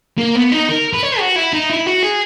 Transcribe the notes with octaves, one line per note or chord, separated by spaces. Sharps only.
A#3
B3
D#4
A#4
B4
C#5
F#4
E4
D#4
E4
F#4
G#4